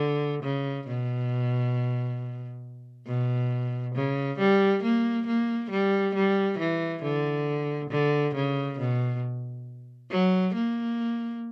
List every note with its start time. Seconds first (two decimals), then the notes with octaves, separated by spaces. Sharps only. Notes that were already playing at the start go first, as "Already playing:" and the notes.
Already playing: D3
0.43 C#3
0.88 B2
3.07 B2
3.95 C#3
4.39 G3
4.84 A#3
5.27 A#3
5.71 G3
6.15 G3
6.59 E3
7.03 D3
7.90 D3
8.35 C#3
8.79 B2
10.11 F#3
10.55 A#3